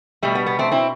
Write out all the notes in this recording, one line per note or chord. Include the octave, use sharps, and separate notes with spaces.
B2 G3 A3
B3
B3
A3 C4
C4 E4